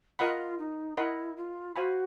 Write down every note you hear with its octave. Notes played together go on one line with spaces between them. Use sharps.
F4 A#4 D#5 F#5 B5
D#4
E4 A#4 D#5 F#5 B5
F4
F#4 C5 F5 G#5 B5